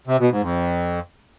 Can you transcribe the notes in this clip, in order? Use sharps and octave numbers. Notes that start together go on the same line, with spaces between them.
C3
B2
G#2
F2